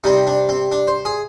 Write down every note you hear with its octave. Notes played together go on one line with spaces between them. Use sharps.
C3 G3 C4 D#4
D4
C4
D4
C5
G#4